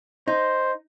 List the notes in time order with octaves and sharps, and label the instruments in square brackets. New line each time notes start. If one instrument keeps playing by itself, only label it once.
[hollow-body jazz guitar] D#4 [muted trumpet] C5